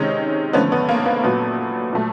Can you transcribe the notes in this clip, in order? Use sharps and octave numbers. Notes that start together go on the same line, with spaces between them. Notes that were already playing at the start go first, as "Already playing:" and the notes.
Already playing: C3 D#3 G#3 C#4 D#4
D3 F3 A3 B3 C#4
B3
A#3
B3
A#2 F#3 A3 B3
A#2 F#3 A3